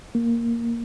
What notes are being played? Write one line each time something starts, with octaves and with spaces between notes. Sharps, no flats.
A#3